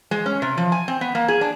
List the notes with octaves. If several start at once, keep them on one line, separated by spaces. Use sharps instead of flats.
G#3
C#4
C3
F3
G#5
C4
B3
A#3
G#4
D4